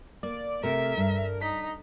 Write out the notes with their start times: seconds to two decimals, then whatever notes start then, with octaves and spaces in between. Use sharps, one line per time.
0.23 A#3 D5
0.63 C3 A3 A#4 E5
0.97 G2
1.42 D#4 B6